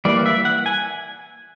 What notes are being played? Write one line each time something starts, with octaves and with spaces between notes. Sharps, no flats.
E3 G3 A#3 D5
E5
F#5
G#5